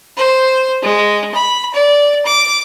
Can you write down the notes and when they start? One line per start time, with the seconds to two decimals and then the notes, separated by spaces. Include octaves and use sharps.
0.17 C5
0.82 G#3
1.34 B5
1.74 D5
2.25 D6